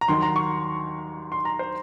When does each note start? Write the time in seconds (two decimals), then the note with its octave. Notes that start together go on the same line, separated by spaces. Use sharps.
0.01 A#5
0.08 D#2 D#3 F#3 C6
0.22 A#5
0.36 C#6
1.32 C6
1.45 A#5
1.59 C5